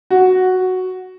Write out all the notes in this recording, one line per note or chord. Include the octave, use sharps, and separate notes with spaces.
F#4